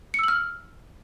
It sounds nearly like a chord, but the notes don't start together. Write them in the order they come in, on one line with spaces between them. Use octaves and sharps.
C#7 E6 F#7 F6